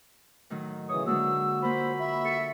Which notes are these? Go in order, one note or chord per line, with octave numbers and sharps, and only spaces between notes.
A2 D#3 F#3
C#3 E3 C#5 D#6
D3 G#3 A#3 F#4 E6
A#3 F4 C5 B5
E5
A4 C#7